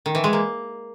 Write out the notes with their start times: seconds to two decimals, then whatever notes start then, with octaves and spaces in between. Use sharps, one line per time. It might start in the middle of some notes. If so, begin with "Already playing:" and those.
0.06 D#3
0.15 E3
0.24 G#3
0.33 A#3